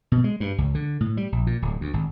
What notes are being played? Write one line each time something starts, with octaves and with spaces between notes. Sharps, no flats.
B2
G#3
G2
C#2
D3
A2
G3
A#1
A#2
D1
D2
G#1